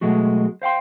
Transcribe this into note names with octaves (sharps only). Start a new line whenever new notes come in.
B2 F#3 G#3 A3 F#4
C5 F5 G5 C6